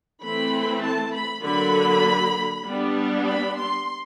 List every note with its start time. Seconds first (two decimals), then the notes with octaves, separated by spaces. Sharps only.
0.22 E3 A3 C4 B5
0.83 A5
1.14 B5
1.44 D3 F#3 A#3 B5
2.66 G3 B3 D4
3.26 B5
3.57 C6